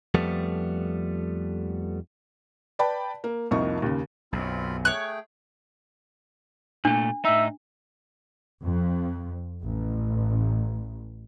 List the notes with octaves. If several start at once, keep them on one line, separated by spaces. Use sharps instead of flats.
F2 F3 G3 A3 B3
B4 D5 G5 A5 B5
A#3
C2 F2 F3 A#3 D#4 C#6
D#2 C#3
B1 F#2 C4 F4 B5
A3 G#4 C#5 G5 F#6
A#2 A3 D4
A2 D#4 E5
F2
A1